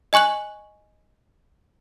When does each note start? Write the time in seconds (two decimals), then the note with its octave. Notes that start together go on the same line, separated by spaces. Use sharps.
0.13 D#5 G#5 C#6 F#6 F#7